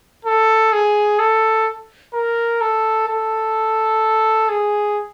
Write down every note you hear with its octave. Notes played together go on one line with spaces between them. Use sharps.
A4
G#4
A4
A#4
A4
A4
G#4